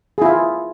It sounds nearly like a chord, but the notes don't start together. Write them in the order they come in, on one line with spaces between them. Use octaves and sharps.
G#4 E4 F4